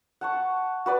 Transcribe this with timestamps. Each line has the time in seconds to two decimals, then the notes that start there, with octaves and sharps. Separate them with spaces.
0.21 F#5 A5 C#6
0.86 F#4 B4 D5